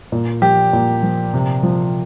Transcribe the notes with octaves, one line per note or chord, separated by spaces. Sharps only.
A#2
F3 G4
A#2
F3
C3
F3